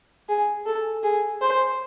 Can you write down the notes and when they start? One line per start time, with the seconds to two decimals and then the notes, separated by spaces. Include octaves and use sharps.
0.29 G#4
0.66 A4
1.04 G#4
1.42 C5